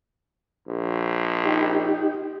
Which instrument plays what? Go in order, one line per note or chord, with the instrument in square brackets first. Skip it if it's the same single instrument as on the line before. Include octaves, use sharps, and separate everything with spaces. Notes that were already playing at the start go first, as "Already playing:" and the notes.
[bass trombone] A#1
[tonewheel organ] D#4 G4